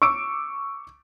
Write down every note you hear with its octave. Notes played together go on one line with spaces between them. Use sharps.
C#6 D6 E6 D7